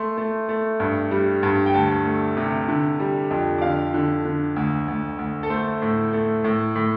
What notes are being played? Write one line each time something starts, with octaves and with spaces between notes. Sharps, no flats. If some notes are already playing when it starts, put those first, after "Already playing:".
Already playing: A3 C6
A3
A3
G2
G3
G2
G5
D2 A5
A3
C3
D3
G3
F2
D5
D3 F5
D3
D3
D2
D2
D2
A4
A3 C5
A2
A3
A2
A2